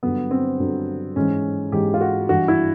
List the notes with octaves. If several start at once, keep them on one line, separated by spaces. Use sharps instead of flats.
G2 D3 F#3 B3
C4
G2 D3 F#3
G#2 E3 C#4
G#2 E3 G4
F4
F#4
G2 E3 F#4
E4